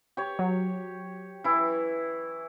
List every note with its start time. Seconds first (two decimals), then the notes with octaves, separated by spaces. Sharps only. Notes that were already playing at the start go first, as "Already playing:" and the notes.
0.17 G4 C#5
0.39 F#3
1.44 E3 E4